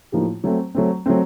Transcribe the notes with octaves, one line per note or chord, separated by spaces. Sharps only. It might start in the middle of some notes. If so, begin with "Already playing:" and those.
A2 F3 A#3 D#4 G4
F#3 A3 C4
F#3 A3 C4
F#3 A3 C4